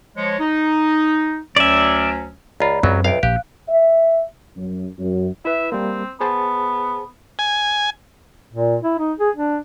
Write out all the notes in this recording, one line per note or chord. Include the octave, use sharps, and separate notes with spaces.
F3 G#3 C#5
D#4
D2 F#3 C#4 D5 E5
C#2 F4 D5 A#5 B5
C#2 F#2 F#3 C4
B1 F2 B4 E5 F5 D7
A#1 G4 F5 F#6
E5
F#2
F#2
E4 B4 E5
G3 A#3 C4
B3 G#4 C5 A5
G#5
A#2
E4
D#4
G#4
D4